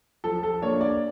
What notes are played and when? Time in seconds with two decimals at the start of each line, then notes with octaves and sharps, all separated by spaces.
0.24 F3 A4
0.43 A4
0.62 A#3 D4 C#5
0.81 D5